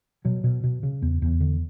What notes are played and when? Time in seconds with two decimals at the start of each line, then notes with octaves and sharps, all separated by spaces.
0.25 B2 F#3
0.44 B2
0.64 B2
0.83 C#3
1.02 E2
1.22 E2
1.40 D3